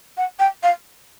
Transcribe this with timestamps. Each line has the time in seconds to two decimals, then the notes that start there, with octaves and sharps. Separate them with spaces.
0.17 F#5
0.39 G5
0.63 F5